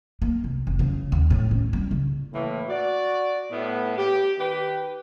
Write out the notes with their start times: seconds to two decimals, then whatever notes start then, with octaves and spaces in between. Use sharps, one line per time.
0.22 A#3
0.44 C2
0.67 F1
0.79 C#3
1.12 D#2
1.30 A2
1.51 C#4
1.73 G3
1.91 C#3
2.33 A2 E3 A#3
2.69 F#4 D5
3.51 A2 B3
3.97 G4
4.39 D#3 G4 B4